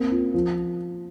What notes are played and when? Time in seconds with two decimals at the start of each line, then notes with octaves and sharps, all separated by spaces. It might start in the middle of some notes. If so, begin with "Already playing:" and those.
Already playing: A#3 C4
0.11 F4
0.34 F3